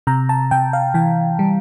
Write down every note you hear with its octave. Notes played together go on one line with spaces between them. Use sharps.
C3 A#5
A5
C3 G5
F5
E3 G5
G3